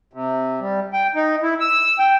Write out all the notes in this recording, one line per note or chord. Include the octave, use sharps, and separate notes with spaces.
C3
G3
G5
D#4
E4
E6
G5